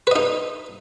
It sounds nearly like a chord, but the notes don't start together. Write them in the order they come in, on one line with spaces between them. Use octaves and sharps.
B4 D#5 D#4